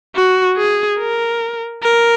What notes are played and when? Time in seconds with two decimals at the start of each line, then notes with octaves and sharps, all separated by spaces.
0.16 F#4
0.57 G#4
0.99 A#4
1.83 A#4